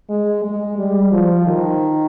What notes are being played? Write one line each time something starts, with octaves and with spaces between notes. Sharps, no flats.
G#3
G#3
G3
F3
D#3